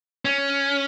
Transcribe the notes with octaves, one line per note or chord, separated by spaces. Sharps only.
C#4